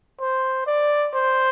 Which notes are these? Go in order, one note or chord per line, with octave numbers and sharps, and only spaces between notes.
C5
D5
C5